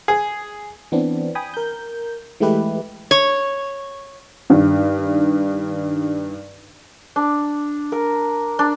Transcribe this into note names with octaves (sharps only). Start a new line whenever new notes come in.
G#4
E3 B3 C4 D4
G5 G#5 B5 D#6
A#4 G6
E3 G#3 A3 E4 G4 B4
C#5
G2 D#3
D4
A#4
D4